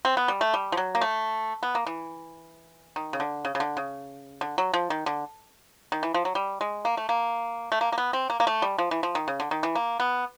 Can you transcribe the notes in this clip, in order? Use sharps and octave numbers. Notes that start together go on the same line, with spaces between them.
C4
B3
G3
A3
G3
F3
F#3
A#3
A3
B3
A#3
E3
D#3
C#3
D3
C#3
C#3
D3
C#3
D3
F#3
F3
D#3
D3
D#3
E3
F3
F#3
G3
G#3
A#3
A3
A#3
A3
A#3
A#3
B3
C4
A#3
A#3
A3
G3
F3
E3
F3
D#3
C#3
D3
D#3
E3
A#3
B3